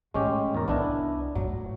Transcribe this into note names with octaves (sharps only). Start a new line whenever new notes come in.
A2 G#3 C#4 G4
E2 A#4
C2 B3 D4 E4
A2 F#3